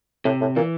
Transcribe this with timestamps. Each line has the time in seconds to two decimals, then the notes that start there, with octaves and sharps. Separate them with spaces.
0.25 A2 C3
0.41 A2
0.56 A#2 E3